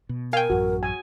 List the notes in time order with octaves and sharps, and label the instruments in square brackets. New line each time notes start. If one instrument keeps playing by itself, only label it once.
[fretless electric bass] B2
[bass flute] A#4 [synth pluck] F5 G5 [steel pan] G#5
[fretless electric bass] A1 F#2 [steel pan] F#4
[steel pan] G#5